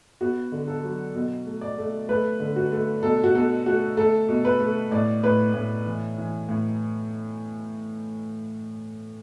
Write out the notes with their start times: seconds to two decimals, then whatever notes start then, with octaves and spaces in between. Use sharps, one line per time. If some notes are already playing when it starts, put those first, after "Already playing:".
0.21 B3 F#4
0.52 D3
0.68 A4
0.83 F#3
1.15 B2
1.46 A3
1.61 D5
1.78 A3
2.09 A3 B4
2.40 D3
2.56 F#4
2.72 A3
3.03 B2 A4
3.24 F#4
3.35 B2 A4
3.66 A3 F#4
3.97 A3 A4
4.29 B2
4.45 B4
4.60 A3
4.91 A2 D5
5.23 A2 B4
5.54 A2
5.86 E3
6.18 E3
6.49 A2